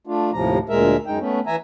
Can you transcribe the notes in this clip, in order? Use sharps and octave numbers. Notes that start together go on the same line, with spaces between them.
A3 D4 F4
D#2 A2 C3 F3 A#5
D2 A#2 G#3 A#4 E5
F#2 G#3 D#4 G5
A3 B3 C#4
E3 E5 G#5 A#5